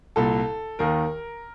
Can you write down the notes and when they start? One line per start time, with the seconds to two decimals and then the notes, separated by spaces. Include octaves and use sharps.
0.16 C2 A#2 A4
0.79 D#2 D#3 A#4